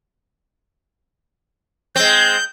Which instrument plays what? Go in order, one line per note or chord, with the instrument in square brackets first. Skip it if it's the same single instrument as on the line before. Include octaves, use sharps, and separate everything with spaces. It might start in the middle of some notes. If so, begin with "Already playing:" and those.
[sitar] G#3 C4 [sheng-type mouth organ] G6